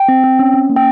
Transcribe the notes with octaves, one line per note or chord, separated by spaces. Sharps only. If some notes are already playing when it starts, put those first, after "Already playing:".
Already playing: G5
C4
C4
C#4
C#4
A#3
G5